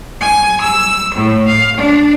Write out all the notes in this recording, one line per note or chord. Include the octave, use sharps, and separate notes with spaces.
G#5
E6
A2
F5
D4